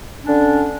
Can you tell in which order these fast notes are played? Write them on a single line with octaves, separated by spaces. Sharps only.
C#4 D4 D3